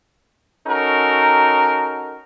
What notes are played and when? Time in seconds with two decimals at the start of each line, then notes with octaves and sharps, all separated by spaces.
0.67 C#4 D#4 F#4 A4 A#4